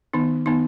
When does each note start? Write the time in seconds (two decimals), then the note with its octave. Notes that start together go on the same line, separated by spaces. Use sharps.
0.13 D#3 B3 D#4
0.46 D#3 B3 D#4